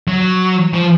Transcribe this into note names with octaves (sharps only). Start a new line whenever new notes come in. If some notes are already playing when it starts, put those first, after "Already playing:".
F#3
F3